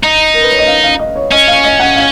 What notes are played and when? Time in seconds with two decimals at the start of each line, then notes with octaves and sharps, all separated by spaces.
0.03 D#4 D#5
0.34 A#4
0.43 B4
0.51 C#5
0.59 D#5
0.67 F5
0.84 F5
0.99 D#5
1.16 C#5
1.32 C#4 D#5
1.48 F5
1.64 D#5
1.80 F#5
1.96 F5